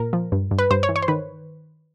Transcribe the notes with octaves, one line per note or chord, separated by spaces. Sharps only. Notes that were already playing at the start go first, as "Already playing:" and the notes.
Already playing: A#2 A#4
F3
G2
G2
B4
G2 C5
C#5
E3
C#5
C5
D#3 B4